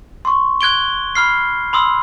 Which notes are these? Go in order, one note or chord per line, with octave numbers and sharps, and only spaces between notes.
C6 C#6
F#6 G#6 D7 G7
B5 F6 C7
B5 C6 D#6 E6